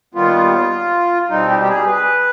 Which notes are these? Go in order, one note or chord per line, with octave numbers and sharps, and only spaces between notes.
D#2 D#3 G3 B3 F4
B2 G3 C4 D#4
G4
G4
G#4
B4